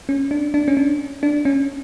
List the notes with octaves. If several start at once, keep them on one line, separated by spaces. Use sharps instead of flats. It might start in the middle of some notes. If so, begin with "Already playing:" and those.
C#4
D4
D4
C#4
D4
D4
C#4